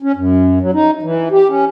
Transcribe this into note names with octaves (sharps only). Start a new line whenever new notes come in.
C#4
F#2
F#3
D#4
E3
G4
C#4